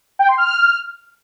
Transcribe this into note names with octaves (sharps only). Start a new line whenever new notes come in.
G5
C6
F6